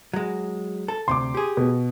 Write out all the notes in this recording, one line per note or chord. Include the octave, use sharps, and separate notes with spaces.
F#3 G#3
A4
D2 C3 C6 D6
G4 G#4
B2